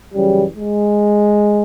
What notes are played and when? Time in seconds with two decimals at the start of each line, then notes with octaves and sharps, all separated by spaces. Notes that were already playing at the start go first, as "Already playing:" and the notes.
0.14 F#2 C#3 E3 G3
0.57 G#3